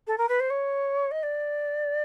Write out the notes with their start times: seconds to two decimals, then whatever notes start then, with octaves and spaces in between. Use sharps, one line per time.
0.07 A4
0.18 A#4
0.29 B4
0.40 C5
0.50 C#5
1.11 D#5
1.23 D5